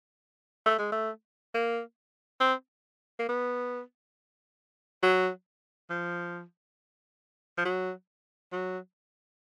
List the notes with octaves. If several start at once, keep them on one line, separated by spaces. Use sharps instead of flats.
A3
G#3
A3
A#3
C4
A#3
B3
F#3
F3
F3
F#3
F#3